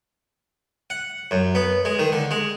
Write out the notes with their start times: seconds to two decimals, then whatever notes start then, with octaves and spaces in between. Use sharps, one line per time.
0.90 F#5
1.31 F#2
1.55 B3
1.85 G#3
1.99 D#3
2.12 D3
2.31 G#3